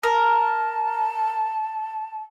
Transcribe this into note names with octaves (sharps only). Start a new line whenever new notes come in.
A#4 A5